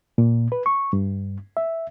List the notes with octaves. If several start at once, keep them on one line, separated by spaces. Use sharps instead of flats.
A#2
B4
C#6
G2
E5